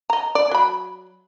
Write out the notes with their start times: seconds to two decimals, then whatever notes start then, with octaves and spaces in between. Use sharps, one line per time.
0.10 D#5 A#5
0.35 D5
0.51 F#3 B5